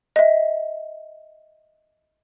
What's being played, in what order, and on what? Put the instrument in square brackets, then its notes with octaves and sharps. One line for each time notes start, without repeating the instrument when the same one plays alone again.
[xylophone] D#5 E5